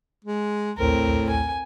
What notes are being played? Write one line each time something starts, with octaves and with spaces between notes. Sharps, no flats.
G#3
A#1 D#2 A2 C4 A#4
G#5